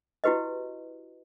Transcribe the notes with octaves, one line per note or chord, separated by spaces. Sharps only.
E4 F#4 G4 B4 D#5